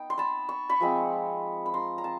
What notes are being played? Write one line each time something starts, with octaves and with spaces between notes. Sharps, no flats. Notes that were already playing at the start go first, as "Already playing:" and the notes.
Already playing: B3 D#4 G5
C6
A5 B5
C#6
B5 C#6
F3 G#3 C4
B5
A#5 C6
A#5
A5